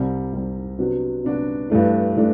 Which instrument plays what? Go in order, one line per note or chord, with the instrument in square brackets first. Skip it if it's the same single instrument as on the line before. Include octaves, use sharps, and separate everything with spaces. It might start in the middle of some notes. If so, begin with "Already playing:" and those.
Already playing: [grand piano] C2 C3 G3 C4
C2 C3 G3 C4
C3 F#3 B3 D4 F#4
C3 F#3 B3 D4 F#4
G2 E3 A3 D4
E3 A3 D4